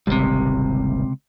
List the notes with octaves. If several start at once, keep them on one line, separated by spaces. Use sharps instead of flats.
D#1 G#1 C#2 C3 G3